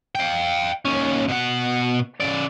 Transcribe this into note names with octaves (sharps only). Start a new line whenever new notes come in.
F5 G5
D#2 C#4
B2 F#5
C#3 D5